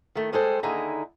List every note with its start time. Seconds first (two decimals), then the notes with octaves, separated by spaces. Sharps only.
0.15 D#3 A3
0.33 G3 G#3 G#4 A4 C5
0.63 D#2 D3 D#4 E4 G#4 A#5